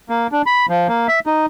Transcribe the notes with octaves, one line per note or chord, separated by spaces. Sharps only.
A#3
D4
B5
F3
A#3
E5
D#4